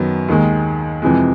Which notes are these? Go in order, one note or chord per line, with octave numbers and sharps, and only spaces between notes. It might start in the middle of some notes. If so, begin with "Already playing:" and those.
Already playing: F#2 D#3 F#3 B3
D#2 D#3 G#3
F2 C3 E3 G#3